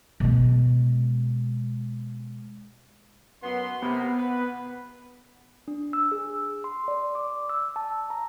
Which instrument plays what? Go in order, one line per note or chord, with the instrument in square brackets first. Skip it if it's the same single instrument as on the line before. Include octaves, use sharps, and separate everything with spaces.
[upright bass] B2 G#3
[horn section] F#2 B3 C6
[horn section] C3 A#3 [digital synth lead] B3
[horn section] B4
[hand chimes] D4
E6
G#4
C6
D5
D6
E6
A5
A#5